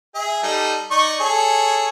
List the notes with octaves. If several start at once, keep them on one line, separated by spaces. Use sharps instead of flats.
G#4 E5
G3 D#4 A4
D#4 D5 C#6
G#4 A4 C#5